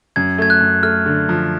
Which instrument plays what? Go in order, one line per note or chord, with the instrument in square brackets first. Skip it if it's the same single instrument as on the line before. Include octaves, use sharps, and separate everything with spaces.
[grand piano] F#2 [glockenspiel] G#6
[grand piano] A3 [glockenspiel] G#6
[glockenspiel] F#6
[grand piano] F#2
[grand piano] A3 [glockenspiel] F6
[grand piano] D3
F3